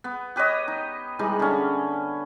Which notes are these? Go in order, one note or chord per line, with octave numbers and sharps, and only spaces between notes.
B3
G4 B4 C#5 D#5
D#4
E3 G3 G#3 D#4
D3 C#4